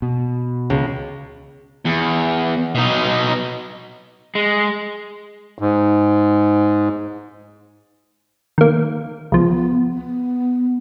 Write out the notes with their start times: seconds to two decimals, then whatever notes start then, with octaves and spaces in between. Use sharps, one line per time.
0.02 B2
0.70 C#2
1.85 E2
2.75 B2 D#4
4.35 G#3
5.59 G#2
8.58 D#3 A#3
9.32 C#2 F3 B3
9.90 B3